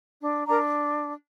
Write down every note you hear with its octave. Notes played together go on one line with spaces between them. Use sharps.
D4
D4 A#4 A#5